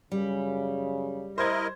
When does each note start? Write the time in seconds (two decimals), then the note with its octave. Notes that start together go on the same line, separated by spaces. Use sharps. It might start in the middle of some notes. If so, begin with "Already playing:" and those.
0.12 F#2 C#3 G3
1.38 E4 A#4 C5 D#5 G#6